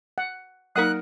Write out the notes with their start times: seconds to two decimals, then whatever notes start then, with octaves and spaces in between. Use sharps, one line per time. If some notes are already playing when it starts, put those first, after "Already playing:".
0.18 F#5
0.76 F#3 A#3 D#4 A#4 F#5 D#6 F#6